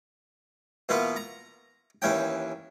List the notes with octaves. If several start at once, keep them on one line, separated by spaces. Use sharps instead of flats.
B2 E3 A#3 B3 F4
A#5
D#2 E3 C#4 G5